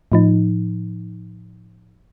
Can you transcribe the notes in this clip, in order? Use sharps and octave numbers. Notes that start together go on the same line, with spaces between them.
A2 F3 D#4